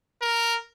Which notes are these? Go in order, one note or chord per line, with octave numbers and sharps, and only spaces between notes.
A#4